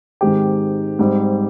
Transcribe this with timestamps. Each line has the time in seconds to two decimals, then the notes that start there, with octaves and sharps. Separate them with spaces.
0.21 G#2 D#3 G#3 C4 G4
0.99 G#2 G3 C4